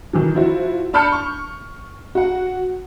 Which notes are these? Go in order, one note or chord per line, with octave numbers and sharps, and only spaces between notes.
D#3 E3 F#3
F3 E4 F#4
D4 A5 B5 F6 G6 C#7
C#6
F#4 F#5